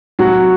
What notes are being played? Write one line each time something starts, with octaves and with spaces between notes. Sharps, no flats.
C2 F#3 F#4